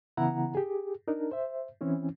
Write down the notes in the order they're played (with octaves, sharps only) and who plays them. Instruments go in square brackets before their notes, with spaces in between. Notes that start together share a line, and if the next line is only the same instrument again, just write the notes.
[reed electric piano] C#3 E3 B3 E4 F#5 A#5
G4 G#4
D4 D#4 A#4
C5 E5
E3 C4 C#4 E4